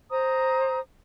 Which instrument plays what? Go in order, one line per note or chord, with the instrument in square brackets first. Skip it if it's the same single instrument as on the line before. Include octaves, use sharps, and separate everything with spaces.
[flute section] C5 A#5 D#6